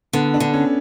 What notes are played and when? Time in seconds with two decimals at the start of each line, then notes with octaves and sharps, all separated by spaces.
0.13 D3 B3
0.34 D4
0.40 D3
0.53 C#4